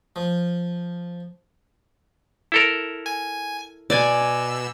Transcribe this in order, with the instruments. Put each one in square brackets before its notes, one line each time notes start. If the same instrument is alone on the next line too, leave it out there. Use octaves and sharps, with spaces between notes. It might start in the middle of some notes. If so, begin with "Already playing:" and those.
[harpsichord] F3
[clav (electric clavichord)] E4 A4 A#4
[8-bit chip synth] G#5
[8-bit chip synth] B2 E6 [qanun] D5 G#5